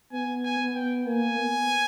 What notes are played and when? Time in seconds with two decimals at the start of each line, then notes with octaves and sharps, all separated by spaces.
0.13 B3 G#5
0.44 G#5
0.60 B3
0.75 G5
1.07 A#3 G#5
1.38 B3